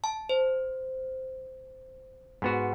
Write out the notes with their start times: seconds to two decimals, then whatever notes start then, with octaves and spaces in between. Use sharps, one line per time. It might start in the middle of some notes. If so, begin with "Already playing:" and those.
0.04 A5
0.29 C5
2.42 G#2 B3 F#4